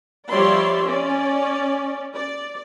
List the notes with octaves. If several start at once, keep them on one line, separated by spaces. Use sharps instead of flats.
F3 G3 C#5 D5 E5 C6
C#4 D5
D5